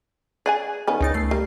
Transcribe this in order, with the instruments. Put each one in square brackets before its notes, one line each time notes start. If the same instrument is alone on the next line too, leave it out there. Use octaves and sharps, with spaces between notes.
[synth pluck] G#4 [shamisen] D5 F#5 G#5
[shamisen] D#3 B3 C#4
[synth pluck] C#2 D#4 A6
A3 C7
[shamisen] G3 A#3